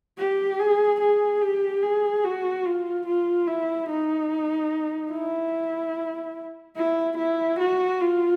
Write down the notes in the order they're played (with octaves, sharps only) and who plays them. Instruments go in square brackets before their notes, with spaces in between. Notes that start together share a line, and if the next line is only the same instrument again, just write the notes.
[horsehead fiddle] G4
G#4
G#4
G4
G#4
F#4
F4
F4
E4
D#4
E4
E4
E4
F#4
F4